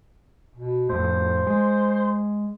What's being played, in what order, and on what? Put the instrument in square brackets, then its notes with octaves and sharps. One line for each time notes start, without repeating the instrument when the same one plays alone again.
[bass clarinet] B2
[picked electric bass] F2 A2 [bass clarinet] C5
[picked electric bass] G#3